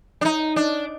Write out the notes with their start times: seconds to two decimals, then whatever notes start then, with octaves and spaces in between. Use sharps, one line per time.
0.21 D4
0.25 D#4
0.56 D4